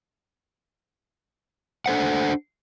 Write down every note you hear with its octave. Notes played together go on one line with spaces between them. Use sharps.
D4 A4 C5 F#5